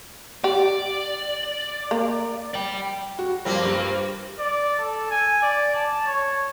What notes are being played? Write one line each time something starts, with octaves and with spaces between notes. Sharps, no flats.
G4 D5
A#3
D5 G5
F#4
G2 F3 G3 A#3 C4
G2 F#7
D5
A4
G#5
D5
A5
C#5